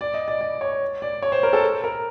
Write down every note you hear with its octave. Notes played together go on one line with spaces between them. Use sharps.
D5
D#5
D5
D5
C#5
D5
C#5
C5
A#4
A4
A#4